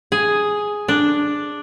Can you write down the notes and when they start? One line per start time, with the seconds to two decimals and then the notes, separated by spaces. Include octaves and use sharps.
0.12 G#4
0.88 D4